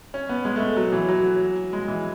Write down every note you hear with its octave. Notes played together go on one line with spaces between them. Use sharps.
C#4
B3
G#3
A3
F#3
E3
F#3
G#3
E3